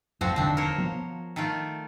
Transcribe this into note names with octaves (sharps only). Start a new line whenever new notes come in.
F#1 F2 F3 C4 F#4
E1 D3 D#3 C4 D4
A#4 C5 C#5
F3 B3
D#3 A3 F4